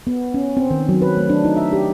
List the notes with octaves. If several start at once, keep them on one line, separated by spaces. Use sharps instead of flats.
B3
C#4
C4
D#3
F#3
B4
A3
D4
D#4
E5
G4